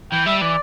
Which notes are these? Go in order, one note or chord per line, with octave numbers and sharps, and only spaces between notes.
E3 G5
G3 E5
E3 D5